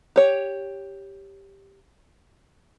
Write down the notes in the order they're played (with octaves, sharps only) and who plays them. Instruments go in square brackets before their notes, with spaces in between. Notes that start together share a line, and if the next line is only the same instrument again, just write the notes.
[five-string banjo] G4 C#5